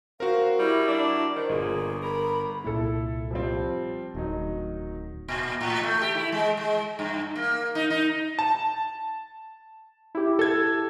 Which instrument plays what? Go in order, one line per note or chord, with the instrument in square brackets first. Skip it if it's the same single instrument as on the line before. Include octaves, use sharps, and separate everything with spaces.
[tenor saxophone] C4 [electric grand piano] F#4 A#4 [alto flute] F5
[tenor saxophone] G3 [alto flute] E4
[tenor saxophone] D4
[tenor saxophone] D#3 [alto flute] C5
[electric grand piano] G1 [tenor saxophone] A#2 [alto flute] G#4
[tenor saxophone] A#4 [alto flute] B5
[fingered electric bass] C2 A#2 A#3 [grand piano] E4 A4
[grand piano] F3 G3 C4
[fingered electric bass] D1 [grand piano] D#3 F#3 D#4
[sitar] A#2
A2
A3
G4
E4
G#3
G#3
G2
A#3
D#4
D#4
[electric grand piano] A5
[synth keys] E4 G4
[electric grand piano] A4 G#6